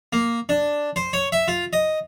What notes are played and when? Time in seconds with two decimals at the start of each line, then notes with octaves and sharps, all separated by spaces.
0.13 A#3
0.49 D4
0.96 C5
1.13 C#5
1.32 E5
1.48 F4
1.73 D#5